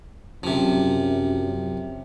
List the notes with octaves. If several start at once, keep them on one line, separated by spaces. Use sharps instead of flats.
F#2 C3 F3